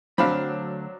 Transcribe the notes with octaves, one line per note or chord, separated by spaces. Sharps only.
D2 F#3 C4 D4 F5 B5